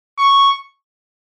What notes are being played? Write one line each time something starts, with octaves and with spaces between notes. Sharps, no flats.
C#6